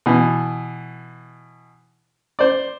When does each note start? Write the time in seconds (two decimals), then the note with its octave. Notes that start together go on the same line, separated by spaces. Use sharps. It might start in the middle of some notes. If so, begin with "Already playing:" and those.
0.06 B2 E3
2.39 C5 D5